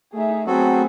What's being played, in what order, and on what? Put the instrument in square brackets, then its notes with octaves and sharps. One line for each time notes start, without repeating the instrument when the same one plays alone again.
[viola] A3 D#4 [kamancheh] G#4 E5
[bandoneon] F#3 F#4 A4 [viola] A3 [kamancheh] B3 G#4 [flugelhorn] C4